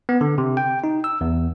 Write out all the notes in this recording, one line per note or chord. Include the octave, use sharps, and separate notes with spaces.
B3
D3
C3
G5
D#4
E6
E2